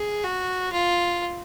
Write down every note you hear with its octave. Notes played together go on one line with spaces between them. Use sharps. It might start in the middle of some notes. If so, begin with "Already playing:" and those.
Already playing: G#4
F#4
F4